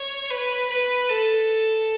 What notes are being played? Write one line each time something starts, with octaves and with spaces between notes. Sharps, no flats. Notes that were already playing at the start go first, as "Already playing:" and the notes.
Already playing: C#5
B4
B4
A4